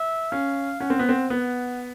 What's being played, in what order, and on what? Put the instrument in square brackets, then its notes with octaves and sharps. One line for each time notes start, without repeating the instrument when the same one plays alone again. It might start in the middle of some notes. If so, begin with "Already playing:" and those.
Already playing: [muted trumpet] E5
[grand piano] C#4 [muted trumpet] F5
[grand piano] C#4 [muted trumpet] F#5
[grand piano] C4
B3
C4
[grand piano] B3 [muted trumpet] F#5